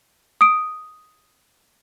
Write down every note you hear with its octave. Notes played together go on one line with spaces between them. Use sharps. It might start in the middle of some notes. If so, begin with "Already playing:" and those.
D#6 D7